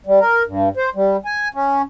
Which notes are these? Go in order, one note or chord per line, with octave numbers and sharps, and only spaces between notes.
G3
A#4
G2
C5
G3
G#5
C#4